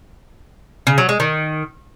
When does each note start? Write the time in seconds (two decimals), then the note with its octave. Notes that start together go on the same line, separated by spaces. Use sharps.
0.87 C#3
0.98 F#3
1.09 G#3
1.20 D#3